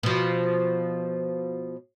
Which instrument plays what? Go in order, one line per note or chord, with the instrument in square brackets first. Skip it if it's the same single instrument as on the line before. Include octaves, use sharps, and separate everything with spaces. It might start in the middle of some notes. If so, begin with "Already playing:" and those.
[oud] B2 F3